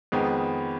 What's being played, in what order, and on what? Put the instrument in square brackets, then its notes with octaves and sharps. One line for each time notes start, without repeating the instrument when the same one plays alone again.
[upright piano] F2 D#3 G#3 B3